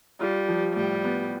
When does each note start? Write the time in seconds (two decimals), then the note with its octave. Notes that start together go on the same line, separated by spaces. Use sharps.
0.21 G3 F4
0.49 F3
0.76 A2 G3
1.04 B3